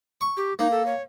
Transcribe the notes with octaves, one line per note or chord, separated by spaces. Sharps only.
C#6
G4
A#3 D#4
A4
C#5